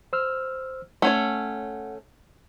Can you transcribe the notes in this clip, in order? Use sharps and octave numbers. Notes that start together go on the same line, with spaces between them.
C5 E6 F6
A3 C#4 C#5 F#5